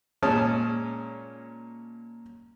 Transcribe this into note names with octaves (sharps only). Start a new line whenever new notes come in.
A#2 G#3 C#4 A5 D#6 F6